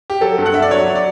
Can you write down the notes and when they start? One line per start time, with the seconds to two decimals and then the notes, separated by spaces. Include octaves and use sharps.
0.10 G4
0.21 F#3 A4
0.38 G2
0.46 F#5
0.54 G2 E5
0.62 D5
0.71 F#3 C#5
0.87 F#3
0.95 D5